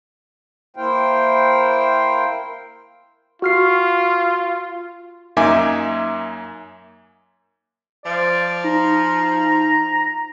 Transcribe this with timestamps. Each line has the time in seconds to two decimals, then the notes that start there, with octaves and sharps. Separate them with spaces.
0.77 A#3 E4 C5 F5 G5
3.42 F4 F#4 F6 C7
5.37 F#2 A#3 D#4 E5 G#5 D6
8.05 F3 D5
8.64 D#4 A#5